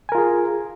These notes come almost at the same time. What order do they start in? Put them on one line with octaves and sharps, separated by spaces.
G#5 A#4 F4 G#4